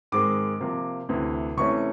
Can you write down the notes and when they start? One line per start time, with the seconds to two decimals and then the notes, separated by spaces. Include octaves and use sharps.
0.12 G#2 D#3 G#3 C4 D6
0.60 C3 F3 A#3
1.09 D2 C3 E3
1.57 C3 E3 A3 C#4 C#6